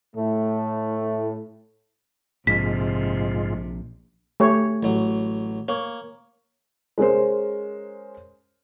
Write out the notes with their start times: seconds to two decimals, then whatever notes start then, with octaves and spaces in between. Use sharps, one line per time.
0.16 A2 A3
2.47 A#1 G#2 C3 G#3 F4 B6
4.40 A3 G4 C#5
4.83 A1 F#3
5.68 A#3 C#5
6.98 G#3 C#4 A#4 C5